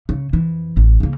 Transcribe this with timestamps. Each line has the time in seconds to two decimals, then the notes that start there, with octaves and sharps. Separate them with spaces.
0.09 C#3
0.33 F2 E3
0.77 A1
1.00 C#3 A#3